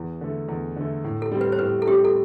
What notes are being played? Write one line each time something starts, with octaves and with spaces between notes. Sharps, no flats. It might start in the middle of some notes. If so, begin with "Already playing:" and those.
Already playing: E2
D3 A3
E2
D3 A3
A2
A4
G3 C4
B4
C5
A2 B4
A4
G3 C4 G4
A4